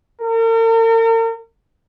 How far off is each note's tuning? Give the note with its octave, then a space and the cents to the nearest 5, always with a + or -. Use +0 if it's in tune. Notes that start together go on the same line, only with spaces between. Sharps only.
A#4 -45